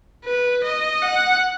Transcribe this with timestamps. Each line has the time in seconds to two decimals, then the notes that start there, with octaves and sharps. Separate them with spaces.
0.25 B4
0.64 D#5
1.02 F#5